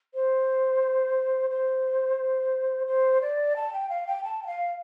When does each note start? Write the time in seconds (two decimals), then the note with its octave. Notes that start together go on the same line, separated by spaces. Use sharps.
0.14 C5
1.50 C5
2.87 C5
3.21 D5
3.56 A5
3.73 G5
3.90 F5
4.07 G5
4.24 A5
4.43 G5
4.47 F5